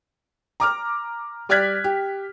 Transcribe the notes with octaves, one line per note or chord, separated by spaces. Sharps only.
A#5 D6 F6
G3 D5 F6 F#6 G#6 B6
G4